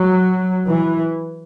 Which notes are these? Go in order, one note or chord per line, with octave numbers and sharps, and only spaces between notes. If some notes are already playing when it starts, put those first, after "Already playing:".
Already playing: F#3
E3